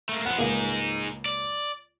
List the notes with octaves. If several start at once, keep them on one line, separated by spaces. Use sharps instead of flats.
A3 A#3
F3 B3 F#5
C#2 A#3 D#4 G#4
D5